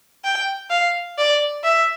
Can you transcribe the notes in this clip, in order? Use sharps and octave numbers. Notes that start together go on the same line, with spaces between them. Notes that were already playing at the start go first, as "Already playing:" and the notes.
G5
F5
D5
E5